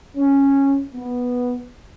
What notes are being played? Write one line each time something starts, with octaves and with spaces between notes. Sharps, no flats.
C#4
B3